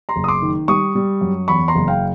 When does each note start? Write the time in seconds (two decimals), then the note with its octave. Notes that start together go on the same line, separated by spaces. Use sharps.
0.09 A#5 C6
0.16 F#1
0.24 D#6
0.28 C6 D6
0.42 D#3
0.68 G3 C#6 D#6
0.95 G3
1.21 F#2
1.48 E2 B5 C#6
1.68 A#5 C6
1.75 F#1
1.88 F5 G5